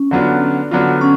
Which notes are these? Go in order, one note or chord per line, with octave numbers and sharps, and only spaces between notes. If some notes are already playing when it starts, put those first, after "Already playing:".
Already playing: C#4
D3 F#3 B3 D4 F4
D3 F#3 B3 D4 F4
C#4